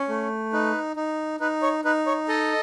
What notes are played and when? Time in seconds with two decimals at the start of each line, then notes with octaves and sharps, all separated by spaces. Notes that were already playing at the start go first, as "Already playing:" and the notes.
Already playing: C#4
0.08 A3
0.53 D#4 B4
0.96 D#4
1.40 D#4 B4
1.62 C#5
1.85 D#4 B4
2.07 C#5
2.28 A4 D#5